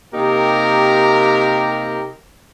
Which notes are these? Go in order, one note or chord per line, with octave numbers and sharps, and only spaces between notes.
C3 A#3 D#4 G4 A#4